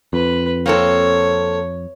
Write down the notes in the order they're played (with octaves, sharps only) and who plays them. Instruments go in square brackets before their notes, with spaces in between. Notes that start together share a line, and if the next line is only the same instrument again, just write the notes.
[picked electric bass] F2 [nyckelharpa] B4
[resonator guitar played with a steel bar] A#3 C4 A4 [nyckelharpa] C#5